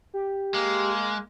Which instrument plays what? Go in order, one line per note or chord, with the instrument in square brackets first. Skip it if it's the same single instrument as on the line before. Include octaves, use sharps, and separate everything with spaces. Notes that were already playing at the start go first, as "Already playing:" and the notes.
[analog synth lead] G4
[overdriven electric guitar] G#3 [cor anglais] A#3